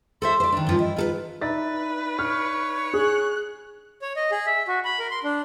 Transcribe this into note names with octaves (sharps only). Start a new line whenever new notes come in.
A4 C5 E5 C6
C5 D5
D#3 D4
G2 F3 C#4
E4 D#5
D#4 F4 A4 B4
D#4 B4 D5 E5 A6
C#5 F6
G#4 F#6
C#5
D#5
G#4
E5
F#4
B5
A#4
C6
D4